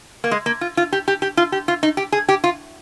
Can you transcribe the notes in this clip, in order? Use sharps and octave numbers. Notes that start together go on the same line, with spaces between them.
A#3
G#3
A#3
F4
F4
G4
G4
G4
F4
G4
F4
D#4
G4
G#4
G4
F4